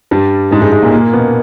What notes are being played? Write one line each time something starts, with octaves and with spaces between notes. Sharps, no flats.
G2 G3
G#2 G#3
G#2 G#3
G#2 G#3
A#2 A#3
A#2 A#3
B2 B3